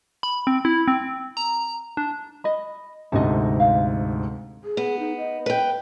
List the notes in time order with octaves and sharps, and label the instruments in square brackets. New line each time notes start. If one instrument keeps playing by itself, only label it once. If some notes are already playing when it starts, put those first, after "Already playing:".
[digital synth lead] B5
C4
E4
C4
A#5
D4
[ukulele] D#5 B5
[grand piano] D2 G#2 C3 [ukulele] A4 D#5
[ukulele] F5
[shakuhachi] G#4
[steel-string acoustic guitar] B3
[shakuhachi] D#4
D#5
[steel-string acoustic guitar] B4 G5